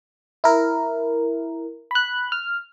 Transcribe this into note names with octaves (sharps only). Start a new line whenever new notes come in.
E4 A#4
B5 F#6
F6